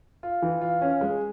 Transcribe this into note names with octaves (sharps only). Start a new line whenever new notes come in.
F4
E3
F4
C#4
G#3